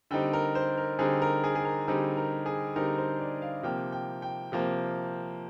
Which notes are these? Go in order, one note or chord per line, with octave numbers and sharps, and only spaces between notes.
D3 G3 C4 D#4 G5
A#4
C5
A#4
D3 G3 C4 D#4 G#4
A#4
G#4
G#4
A#4
D3 G3 C4 D#4 G#4
A#4
G#4
D3 G3 C4 D#4 A#4
C5
D5
F5
C3 F3 A#3 G5
G5
G5
C3 F3 A#3